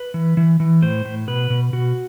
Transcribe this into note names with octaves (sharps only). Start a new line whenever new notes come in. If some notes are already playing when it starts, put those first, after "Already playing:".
Already playing: B4
E3
E3
E3
A2 C5
A2
B2 B4
B2
B2 F#4